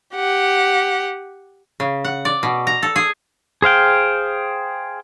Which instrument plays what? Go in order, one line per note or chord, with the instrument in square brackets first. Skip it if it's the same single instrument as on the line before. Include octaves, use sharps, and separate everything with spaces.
[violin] G4 F#5
[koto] C#3
F#5
D5
B2
A#5
A4
G#4
[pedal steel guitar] G#4 C5 F5 G5